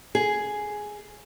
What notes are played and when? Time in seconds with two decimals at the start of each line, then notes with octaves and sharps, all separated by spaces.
0.15 G#4